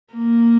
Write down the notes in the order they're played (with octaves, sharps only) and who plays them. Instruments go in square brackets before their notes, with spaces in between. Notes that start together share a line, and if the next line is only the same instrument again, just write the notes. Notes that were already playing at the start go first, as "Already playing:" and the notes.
[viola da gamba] A#3